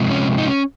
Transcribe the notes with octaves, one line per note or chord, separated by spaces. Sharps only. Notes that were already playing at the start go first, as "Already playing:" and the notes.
Already playing: C3 F3 G#3
C#4
D#4
C#4